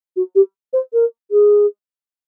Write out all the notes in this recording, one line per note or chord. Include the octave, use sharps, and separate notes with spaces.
F#4
G4
C5
A#4
G#4